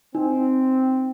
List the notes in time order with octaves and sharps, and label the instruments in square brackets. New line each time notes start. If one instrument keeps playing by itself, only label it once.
[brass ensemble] C4 [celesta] D#4